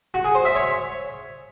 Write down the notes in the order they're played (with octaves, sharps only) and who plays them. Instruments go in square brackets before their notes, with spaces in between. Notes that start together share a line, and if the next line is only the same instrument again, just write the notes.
[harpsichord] F#4
G#4
C5
E5
C#5